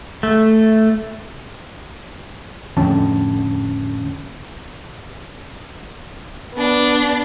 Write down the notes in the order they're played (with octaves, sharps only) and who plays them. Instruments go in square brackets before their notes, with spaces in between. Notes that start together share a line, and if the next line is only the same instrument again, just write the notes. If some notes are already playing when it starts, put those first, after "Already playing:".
[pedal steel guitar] A3
[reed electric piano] F2 A2 D3 C#4 G5 A5
[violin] B3 D4